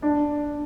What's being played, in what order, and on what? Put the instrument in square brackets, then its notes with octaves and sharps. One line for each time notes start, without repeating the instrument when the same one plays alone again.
[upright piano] D4